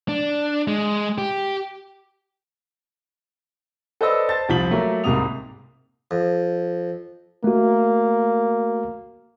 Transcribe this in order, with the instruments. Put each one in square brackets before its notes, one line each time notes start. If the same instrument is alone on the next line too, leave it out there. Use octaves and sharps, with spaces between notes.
[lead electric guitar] D4
G#3
G4
[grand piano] A4 B4 C5 D5 D#5 E6
C5 A5 A6
C2 F3 B6 F#7
F#3 A3 A#3 A#4
C2 G#2 C3 A#3 D#6 F7
[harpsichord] F2
[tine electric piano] A3 F#4 [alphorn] A#3